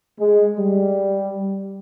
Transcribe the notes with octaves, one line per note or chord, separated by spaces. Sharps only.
G#3
G3